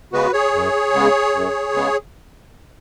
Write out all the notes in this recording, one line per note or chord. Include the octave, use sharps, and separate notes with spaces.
C#3 G#3 B3 F#4 B4
G#4 C#5
F#2
C#3 G#3 B3
F#2
C#3 G#3 B3